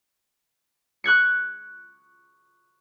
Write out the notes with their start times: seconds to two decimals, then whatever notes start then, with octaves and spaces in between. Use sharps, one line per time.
1.04 C#6 F#6 G#6 C#7